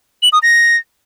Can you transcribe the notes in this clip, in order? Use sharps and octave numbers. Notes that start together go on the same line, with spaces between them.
F#7
D#6
A#6